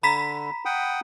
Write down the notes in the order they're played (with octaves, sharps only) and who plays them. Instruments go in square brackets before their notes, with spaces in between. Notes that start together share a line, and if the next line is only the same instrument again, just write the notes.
[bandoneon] D3 [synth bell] A#5 B5 B6
[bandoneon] F#5 G5 D#6